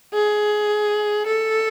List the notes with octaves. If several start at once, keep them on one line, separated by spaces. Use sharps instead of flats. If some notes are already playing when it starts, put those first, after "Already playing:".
G#4
A4